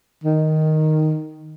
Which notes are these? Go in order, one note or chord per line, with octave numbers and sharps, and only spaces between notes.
D#3